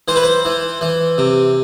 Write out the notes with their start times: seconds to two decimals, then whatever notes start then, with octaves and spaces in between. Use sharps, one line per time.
0.08 E3 C5
0.16 B4
0.23 C5
0.45 E3
0.81 E3
1.18 C3